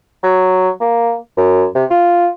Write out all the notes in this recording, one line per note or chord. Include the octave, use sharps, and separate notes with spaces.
F#3
A#3
F#2
C3
F4